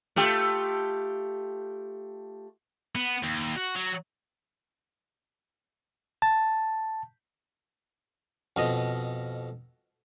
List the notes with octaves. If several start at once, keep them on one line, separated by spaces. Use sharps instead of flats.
A3 F4 G4
B3
D#2
F#4
F#3
A5
F2 B2 D#5